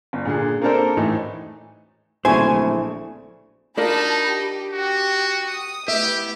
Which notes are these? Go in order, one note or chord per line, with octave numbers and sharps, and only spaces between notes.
G1
A#2 D3 G#4
A#3 C4 D4 A4 A#4 C5
A2 E3 A3 D#4
D1 A#1 C#3 A3 E4 C5 G#5 C#6
D4 D#4 F4 F#4 A#4 A5 B5
G4
F#4 G4 G5
D#6
A3 B3 E4 G4 E5